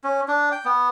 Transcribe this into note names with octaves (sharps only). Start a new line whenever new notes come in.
C#4
D4
G5
B3